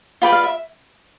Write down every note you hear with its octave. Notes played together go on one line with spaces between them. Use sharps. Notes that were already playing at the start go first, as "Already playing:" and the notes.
F4 B4 D5 G5
F5
E5